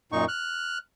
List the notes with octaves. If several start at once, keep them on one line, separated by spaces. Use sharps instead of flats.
F#2 A#2 D#4 C#6
F6 F#6